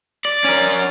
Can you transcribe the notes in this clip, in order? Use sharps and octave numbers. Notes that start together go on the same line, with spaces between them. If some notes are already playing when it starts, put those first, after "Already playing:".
D5
C#4 A#4